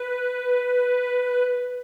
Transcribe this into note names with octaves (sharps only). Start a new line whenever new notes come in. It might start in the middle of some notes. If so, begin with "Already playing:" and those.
Already playing: B4